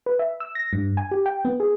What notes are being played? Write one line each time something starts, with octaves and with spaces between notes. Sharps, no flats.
B4
E5
E6
A#6
G2
G#5
G4
G5
B3
G#4